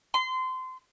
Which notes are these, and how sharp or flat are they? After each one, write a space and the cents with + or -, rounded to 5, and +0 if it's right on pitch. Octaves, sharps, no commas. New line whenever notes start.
C6 -25